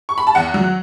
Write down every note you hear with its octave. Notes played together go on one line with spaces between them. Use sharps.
C#6
B5
A5
E2 F#5
F#3